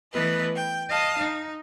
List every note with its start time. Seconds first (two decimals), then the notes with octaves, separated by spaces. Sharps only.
0.13 E3 A3 B3 B4 D#5
0.56 G5
0.89 D#5 F5 A5 D#6
1.19 D#4